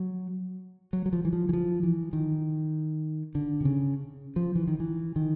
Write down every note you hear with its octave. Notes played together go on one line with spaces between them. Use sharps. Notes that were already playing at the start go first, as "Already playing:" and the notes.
Already playing: F#3
F#3
F#3
F3
E3
F3
E3
F3
E3
D#3
D3
C3
C#3
F3
E3
D#3
E3
D#3